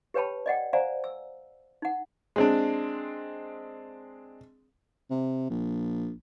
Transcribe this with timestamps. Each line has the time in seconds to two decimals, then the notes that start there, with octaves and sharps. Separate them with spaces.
0.14 G4 B4 C#5 G5 A5 B5
0.46 D5 D#5 F#5 G5
0.73 C5 D5 F5 F#5 G#5 A#5
1.04 E6
1.82 D#4 F#5
2.36 G#3 C4 D4
5.10 C3
5.50 A#1